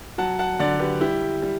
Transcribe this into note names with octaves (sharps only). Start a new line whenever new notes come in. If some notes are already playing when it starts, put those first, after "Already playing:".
F#3 F#5 A5
F#5 A5
D3 D5 F#5
G4 B4
G3 E4 G4
G3